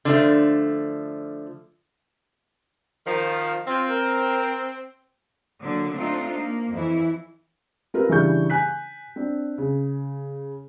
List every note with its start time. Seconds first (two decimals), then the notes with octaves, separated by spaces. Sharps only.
0.05 D3 F3 A3
3.06 D#3 F3
3.68 C4 F4
3.89 A#4
5.60 D3 F#3 A#3
5.94 A3 C4 D4 D#4 F4
6.40 A#3
6.72 F2 E3 E4
7.94 C4 F4 G4 A#4 B4
8.09 C#3 E3 G3 D4 C#6 G6
8.50 G#5 F#6 B6
9.16 C4 D4
9.58 C#3